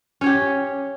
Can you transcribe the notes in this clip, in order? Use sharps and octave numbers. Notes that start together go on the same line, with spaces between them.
C#4 G4 C#5